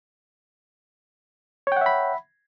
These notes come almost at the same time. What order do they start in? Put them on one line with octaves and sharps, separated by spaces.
C#5 G5 F#5 E5 B5